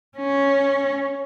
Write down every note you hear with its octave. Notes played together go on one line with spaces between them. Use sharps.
C#4